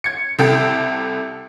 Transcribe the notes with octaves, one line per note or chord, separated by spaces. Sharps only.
G#6 C#7
C2 C3 E4 A4 G5